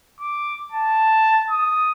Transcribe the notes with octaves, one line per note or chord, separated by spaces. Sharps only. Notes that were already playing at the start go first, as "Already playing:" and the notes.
D6
A5
D#6